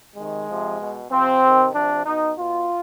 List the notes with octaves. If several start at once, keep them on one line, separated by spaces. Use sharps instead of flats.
C3 D#3 G#3
C3 F3
B2
C3 F3 C4
C3 D#3
C3 F3 D4
B2 D#4
B2 F4